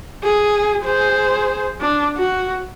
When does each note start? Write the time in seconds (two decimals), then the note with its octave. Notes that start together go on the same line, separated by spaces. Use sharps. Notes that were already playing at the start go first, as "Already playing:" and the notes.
0.23 G#4
0.84 G#4 C5
1.81 D4
2.17 F#4